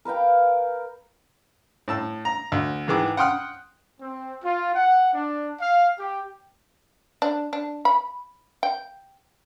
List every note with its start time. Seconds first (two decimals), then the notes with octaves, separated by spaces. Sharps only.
0.05 A#4 B4 F5 G5
1.88 A2 A5 E6
2.25 A#5
2.52 D2
2.88 G#2 D#3 E3 G#4 D6
3.17 F#5 G5 C6 D#6 F6 F#6
4.00 C4
4.43 F4
4.75 F#5
5.13 D4
5.60 F5
5.98 G4
7.22 D4
7.53 D4
7.85 B5
8.63 G5